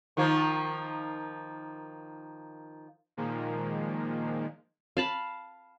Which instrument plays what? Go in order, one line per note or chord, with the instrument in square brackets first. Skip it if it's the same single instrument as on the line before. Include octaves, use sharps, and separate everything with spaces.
[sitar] D#3 F3 A#3
[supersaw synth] A#2 D#3 F3 G#3 A#3
[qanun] F5 A5 B5